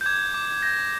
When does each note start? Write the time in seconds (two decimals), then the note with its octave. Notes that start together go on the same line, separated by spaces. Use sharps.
0.01 G6
0.06 D6 G#6
0.34 D6
0.62 G6 A#6